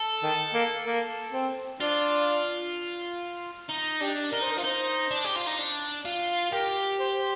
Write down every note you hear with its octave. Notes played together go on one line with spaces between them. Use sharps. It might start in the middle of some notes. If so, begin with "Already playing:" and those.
Already playing: A4
D#3
A#3
A#3
C4
D4 F4
D#4
D4 G4
D#4 A#4
C5
A#4
F4
D#4 C5
D4
G4
F4
D#4
D4
F4
G4 A#4
C5
C5